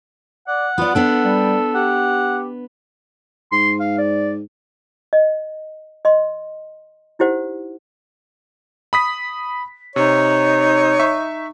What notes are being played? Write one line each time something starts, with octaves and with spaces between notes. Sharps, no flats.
D5 F#5
B3 F4 D5
B3 D4 A4 G5
G3
G4 F#5
G#2 C6
F5
D5
D#5
D#5 C6
D#4 E4 G4 C5 F#5
B5 D#6 B6
C3 D#4 C#5
E5 C#6